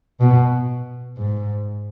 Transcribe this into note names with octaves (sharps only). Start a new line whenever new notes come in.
B2
G#2